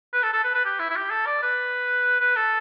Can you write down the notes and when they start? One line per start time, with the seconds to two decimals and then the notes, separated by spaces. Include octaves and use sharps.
0.13 B4
0.23 A4
0.33 A4
0.44 B4
0.54 B4
0.65 G4
0.79 E4
0.90 E4
0.96 G4
1.10 A4
1.26 D5
1.42 B4
2.20 B4
2.36 A4